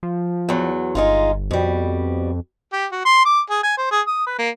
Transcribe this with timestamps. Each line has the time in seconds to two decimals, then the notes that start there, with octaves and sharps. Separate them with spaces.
0.03 F3
0.49 E2 F#3
0.95 G1 G#3 D#4 F4
1.51 F2 B2 G3
2.73 G4
2.92 F#4
3.05 C6
3.25 D6
3.50 G#4
3.63 G#5
3.78 C5
3.91 G#4
4.07 D#6
4.27 B4
4.39 A#3